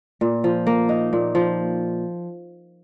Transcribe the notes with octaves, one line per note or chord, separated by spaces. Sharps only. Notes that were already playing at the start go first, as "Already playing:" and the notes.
A#2
F3
A#3
D#4
A#2
F3